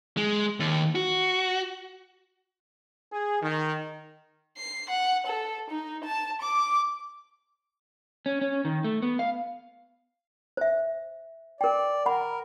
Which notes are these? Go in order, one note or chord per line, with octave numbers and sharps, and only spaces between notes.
G#3
D#2
F#4
G#4
D#3
C7
F#5
A4
D#4
A5
D6
C#4
C#4
D#3
A3
B3
F5
C5 E5
A#4 D5 G5
A#4 F#5 B5